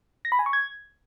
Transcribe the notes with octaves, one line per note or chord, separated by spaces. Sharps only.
A#6
B5
G#5
C#6
G#6